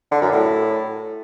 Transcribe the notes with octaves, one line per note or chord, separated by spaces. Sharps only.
D3
F#2
A2